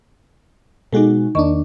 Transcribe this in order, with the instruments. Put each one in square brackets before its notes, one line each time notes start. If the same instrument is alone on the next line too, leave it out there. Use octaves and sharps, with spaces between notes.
[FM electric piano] B2 G#3 F#4 [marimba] D#4 A4
[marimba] E2 D#5 C#6 [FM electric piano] D#3 A#3 D4